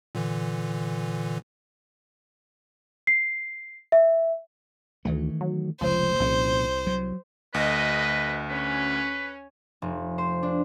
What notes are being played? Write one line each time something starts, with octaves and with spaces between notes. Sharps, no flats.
A#2 D3 E3
C7
E5
D2 D#3 E3 A3
F#3
F1 C#2 F3 C5
C2 A#2 F3 C#4
F#3
D2 B4 D#5
C#4 B4
F1
C5
D4